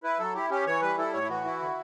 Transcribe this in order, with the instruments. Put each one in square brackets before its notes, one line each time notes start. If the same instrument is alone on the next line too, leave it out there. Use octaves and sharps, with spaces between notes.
[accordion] E4 B4
F#3 A4
E4 G4
C#4 G4
E3 C#5
G3 B4
E4 A4
A2 C#5
E4
E3 F#4
E4
D3